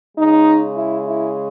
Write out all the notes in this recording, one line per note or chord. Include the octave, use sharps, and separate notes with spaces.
C#3 G#3 D#4
E4
E4